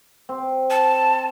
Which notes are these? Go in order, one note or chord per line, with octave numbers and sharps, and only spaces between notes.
C4
A5